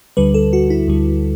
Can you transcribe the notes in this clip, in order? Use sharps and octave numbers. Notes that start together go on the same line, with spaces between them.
D2 D3 G3 B4
A4
F#4
E4
D2 D3 G3